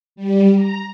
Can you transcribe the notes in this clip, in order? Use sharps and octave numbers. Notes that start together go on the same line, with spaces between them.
G3
A#5